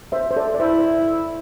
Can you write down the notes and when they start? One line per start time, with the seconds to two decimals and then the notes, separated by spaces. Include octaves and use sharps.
0.12 C5 E5
0.31 C5
0.36 A4 D5
0.54 D5
0.60 E4 C5 E5